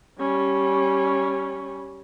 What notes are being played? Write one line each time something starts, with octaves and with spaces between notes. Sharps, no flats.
G3 C#4